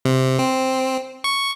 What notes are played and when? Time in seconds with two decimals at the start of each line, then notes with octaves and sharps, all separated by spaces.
0.05 C3
0.39 C4
1.24 C#6